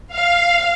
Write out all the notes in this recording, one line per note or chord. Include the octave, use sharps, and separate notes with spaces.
F5